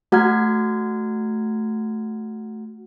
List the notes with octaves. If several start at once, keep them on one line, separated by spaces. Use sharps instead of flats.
A3 F#4 F#5 A#5 F6 G#6